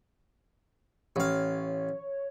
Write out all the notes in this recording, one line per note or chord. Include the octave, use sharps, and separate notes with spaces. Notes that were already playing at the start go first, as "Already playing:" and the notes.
A1 C#5 F5